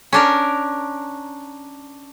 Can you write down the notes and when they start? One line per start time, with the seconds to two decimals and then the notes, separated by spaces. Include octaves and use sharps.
0.13 C#4 D4 A#4